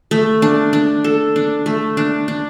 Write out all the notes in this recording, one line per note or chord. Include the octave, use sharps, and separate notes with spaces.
A3
D4
D4
A4
D4
A3
D4
D4